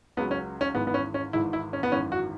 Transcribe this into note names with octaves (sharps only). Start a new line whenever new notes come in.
C#2 C#3 F#3 B3
C#4
C#4
G#1 G#2 E3 B3
B3
C#4
C#4
G#1 G#2 E3 E4
E4
C#4
B3
G#1 F#2 E3 C#4
F#4